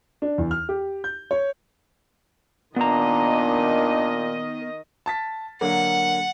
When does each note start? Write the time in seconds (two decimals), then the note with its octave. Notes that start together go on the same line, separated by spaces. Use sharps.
0.22 D4
0.38 E2
0.51 F6
0.69 G4
1.04 G6
1.31 C#5
2.76 A#2 D#3 B3 D4 D#5 A#5
5.06 A5 A6 B6
5.61 D3 F#3 A#3 F#5